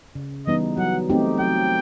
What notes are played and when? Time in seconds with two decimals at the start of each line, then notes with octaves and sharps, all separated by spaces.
0.15 C#3
0.47 E3 G3 B3 D#4 D#5
0.77 F#3 F#5
1.10 A3 C4 D#4 G4
1.40 F#3 G5